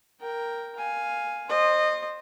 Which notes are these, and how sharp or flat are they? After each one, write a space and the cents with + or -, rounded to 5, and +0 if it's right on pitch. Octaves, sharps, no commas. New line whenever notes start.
A#4 +0 G5 +0
F5 +5 G#5 +0
C5 +10 D#5 -25